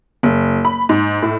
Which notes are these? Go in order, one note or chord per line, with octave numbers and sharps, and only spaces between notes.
F#1
B5
G#2
A2